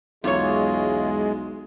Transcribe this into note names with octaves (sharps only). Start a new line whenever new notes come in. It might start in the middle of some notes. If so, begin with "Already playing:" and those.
B1 E2 G#3 F4 C#5